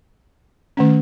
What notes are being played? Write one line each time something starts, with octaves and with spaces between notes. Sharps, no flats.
D#3 A3 C#4